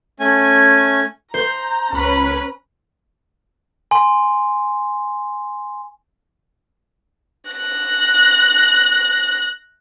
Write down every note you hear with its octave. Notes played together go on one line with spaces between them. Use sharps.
A3 C#4 G#5
C5 A#5 G6
C#2 C#4 B4 B5
G#5 C6
F#6 A#6